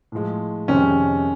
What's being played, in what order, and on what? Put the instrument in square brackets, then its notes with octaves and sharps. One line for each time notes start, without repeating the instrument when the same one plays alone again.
[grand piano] A2 F3 G#3
[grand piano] F2 C3 D#3 G#3 C4 [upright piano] C#4